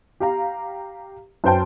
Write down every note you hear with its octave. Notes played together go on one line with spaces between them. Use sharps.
G4 F5 A#5
F#2 B4 C5 G5 A5